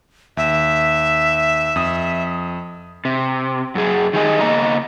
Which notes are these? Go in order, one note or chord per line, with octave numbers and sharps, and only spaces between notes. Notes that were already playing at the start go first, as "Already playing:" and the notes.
D#2 E5
F2 D#6
C3
F#2 G#4
D#3 G3 G#4 D#5
C#3 A#3 D#5 A#5